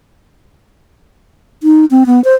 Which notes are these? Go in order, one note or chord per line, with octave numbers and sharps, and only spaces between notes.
D#4
C4
B3
C5